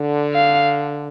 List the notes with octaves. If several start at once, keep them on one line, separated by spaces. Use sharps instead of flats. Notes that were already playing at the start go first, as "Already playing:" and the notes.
Already playing: D3
F5